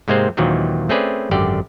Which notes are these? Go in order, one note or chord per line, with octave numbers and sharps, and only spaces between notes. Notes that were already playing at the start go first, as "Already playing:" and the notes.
G#2 C3 G#3 A#3 C4 C5
D#2 A#2 D#3 E3 F#3 C4
A3 C4 C#4 G#4 B4 D5
G#1 F#2 D3 G4 D5 G5